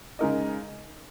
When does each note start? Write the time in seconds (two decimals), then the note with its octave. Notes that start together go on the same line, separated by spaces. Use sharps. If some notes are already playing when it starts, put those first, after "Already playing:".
0.19 C#3 G#3 D#4 A#4 D#5